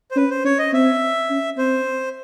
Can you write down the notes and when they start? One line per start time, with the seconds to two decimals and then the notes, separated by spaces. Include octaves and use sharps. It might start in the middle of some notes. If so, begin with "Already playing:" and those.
0.11 C5
0.16 C#4 B4
0.30 C5
0.44 C#4 C#5
0.59 D#5
0.73 C4 E5
1.30 C#4
1.58 C4 C5